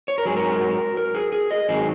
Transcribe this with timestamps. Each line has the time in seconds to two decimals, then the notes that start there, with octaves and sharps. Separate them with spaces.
0.08 C#5
0.18 A#4
0.25 G#2 F#3 G#4
0.37 A#4
0.97 A#4
1.15 G#4
1.32 G#4
1.51 D#5
1.69 G#2 D#3 F#3 G#4